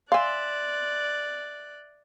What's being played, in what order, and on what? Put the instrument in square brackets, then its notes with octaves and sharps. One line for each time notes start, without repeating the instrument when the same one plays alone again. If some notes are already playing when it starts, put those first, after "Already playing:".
[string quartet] D5 F#6 [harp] E5 C6 [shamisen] F5 G#5